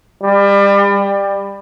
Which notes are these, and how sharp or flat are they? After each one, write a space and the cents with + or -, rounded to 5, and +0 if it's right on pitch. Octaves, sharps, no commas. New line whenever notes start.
G3 +30
G3 +20